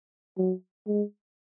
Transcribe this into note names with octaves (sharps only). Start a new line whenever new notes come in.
F#3
G#3